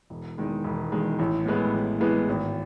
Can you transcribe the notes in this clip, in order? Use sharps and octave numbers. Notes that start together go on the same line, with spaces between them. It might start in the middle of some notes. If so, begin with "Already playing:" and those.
E1
E2 D#3 G#3
E1
E2 D#3 G#3
A1
A2 E3 G#3 B3
A1
A2 E3 G#3 B3
G#1